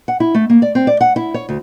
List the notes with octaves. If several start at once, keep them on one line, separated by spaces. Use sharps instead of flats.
F#5
E4
A3
A#3
D5
C4
D5
F#5
E4
C#5
D2